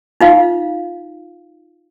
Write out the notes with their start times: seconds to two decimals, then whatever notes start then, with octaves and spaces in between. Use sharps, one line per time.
0.21 D#4 F4 F5